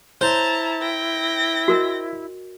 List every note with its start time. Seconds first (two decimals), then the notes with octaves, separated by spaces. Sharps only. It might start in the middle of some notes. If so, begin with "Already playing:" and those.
0.21 E4 C5 C#5 A5 A#5
0.81 G5 A#6
1.68 F#4 A#4 D#5